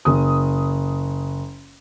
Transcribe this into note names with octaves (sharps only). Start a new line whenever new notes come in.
F#1 D#6